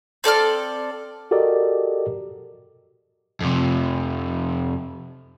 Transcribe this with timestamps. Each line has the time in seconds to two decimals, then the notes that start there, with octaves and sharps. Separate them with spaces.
0.24 C4 A4 D5 F6
1.31 F#4 G4 A4 A#4 D5 D#5
3.41 F2 C3